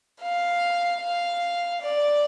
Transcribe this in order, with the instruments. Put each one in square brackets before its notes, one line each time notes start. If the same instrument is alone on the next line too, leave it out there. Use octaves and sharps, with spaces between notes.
[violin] F5
F5
D5